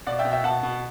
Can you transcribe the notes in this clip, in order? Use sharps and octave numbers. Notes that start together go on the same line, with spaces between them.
B2 D5 F#5
E5 G5
B2
E5 G5
B2 F#5 A5
B2